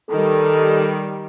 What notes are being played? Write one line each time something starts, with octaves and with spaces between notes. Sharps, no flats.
D#3 G3 A4